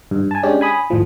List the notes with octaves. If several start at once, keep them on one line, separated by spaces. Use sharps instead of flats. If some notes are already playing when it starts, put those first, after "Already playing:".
G2
G#5 A5
G#3 C#4 D4 G4
G#5 B5 D#6
G#1 A2 F3